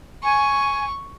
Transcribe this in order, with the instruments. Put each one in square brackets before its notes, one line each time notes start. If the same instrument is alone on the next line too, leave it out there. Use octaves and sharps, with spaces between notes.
[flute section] G#5 [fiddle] C#6